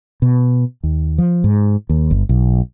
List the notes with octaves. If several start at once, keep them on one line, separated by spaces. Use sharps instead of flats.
B2
D#2
F3
G#2
D#2
G1
B1